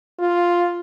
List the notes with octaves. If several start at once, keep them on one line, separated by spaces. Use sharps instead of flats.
F4